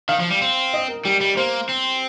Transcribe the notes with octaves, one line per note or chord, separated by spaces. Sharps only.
D#3 F5
F3
G3
C4
D#5
A#4
G3 G4
G3
A#3 C5
C4